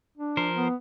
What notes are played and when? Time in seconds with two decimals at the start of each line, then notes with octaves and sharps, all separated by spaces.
0.18 D4
0.37 F3 A#4 C5
0.55 B3